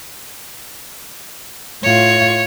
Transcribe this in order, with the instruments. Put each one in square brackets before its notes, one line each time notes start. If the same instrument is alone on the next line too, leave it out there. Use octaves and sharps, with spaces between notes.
[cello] A2 F4 [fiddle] C#5